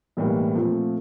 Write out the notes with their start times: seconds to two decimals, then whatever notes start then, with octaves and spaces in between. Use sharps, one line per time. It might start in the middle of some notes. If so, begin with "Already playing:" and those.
0.17 B1 A2 E3 G3 A#3
0.55 A#2 F3 A3 C4